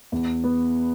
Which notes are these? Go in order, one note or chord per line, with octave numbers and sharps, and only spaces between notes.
E2
B3